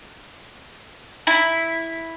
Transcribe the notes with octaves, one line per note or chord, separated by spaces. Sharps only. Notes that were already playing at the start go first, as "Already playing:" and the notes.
E4